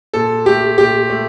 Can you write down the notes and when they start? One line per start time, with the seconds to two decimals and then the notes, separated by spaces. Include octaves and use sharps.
0.14 A#2 A4
0.46 A3 G4
0.78 A#2 G4
1.10 A3